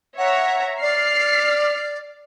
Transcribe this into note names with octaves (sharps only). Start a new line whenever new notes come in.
C#5 E5 F#5 A#5
D5 F6 C7